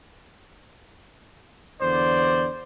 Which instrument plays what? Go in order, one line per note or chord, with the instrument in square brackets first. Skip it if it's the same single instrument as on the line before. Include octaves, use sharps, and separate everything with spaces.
[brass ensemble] E2 D3 D5 [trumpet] C5